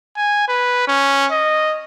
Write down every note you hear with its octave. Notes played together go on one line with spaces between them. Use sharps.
G#5
B4
C#4
D#5